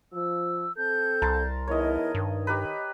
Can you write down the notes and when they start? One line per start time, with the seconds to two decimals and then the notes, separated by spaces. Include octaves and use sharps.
0.13 F3 E6
0.76 C4 A4 G6
1.22 C2 A#4 A5 C6
1.68 E2 D#4 E4 A#4 C#5 D#5
2.15 G2 D#3
2.47 G4 A#4 B4 D#5